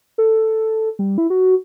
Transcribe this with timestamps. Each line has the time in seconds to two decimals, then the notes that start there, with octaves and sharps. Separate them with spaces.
0.18 A4
0.99 G3
1.18 E4
1.30 F#4